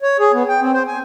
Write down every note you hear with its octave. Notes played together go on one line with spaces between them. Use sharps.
C#5
G#4
B3
G5
C4
C5
G#5